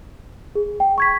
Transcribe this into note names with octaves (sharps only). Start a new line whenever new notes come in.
G#4
G5
C#6 G#6 B6